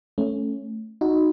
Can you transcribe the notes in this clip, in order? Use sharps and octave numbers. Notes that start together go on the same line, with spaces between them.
A3 C#4
D#4 F#4